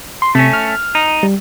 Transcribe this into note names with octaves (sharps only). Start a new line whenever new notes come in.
C6
C3 A3 C#4
F6
D#4
G3